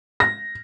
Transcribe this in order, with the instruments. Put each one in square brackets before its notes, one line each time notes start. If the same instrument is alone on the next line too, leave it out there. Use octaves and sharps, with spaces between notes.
[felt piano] A#6